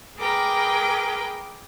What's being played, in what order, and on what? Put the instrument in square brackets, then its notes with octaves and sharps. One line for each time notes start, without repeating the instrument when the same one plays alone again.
[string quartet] G#4 A#4 B4 G5 D6